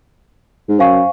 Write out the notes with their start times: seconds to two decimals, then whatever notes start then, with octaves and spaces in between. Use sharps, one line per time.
0.68 G#2
0.79 F#2 C5 F5 G#5 C#6